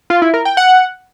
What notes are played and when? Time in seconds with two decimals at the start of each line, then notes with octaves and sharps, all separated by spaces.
0.10 F4
0.22 E4
0.34 A#4
0.45 G5
0.57 F#5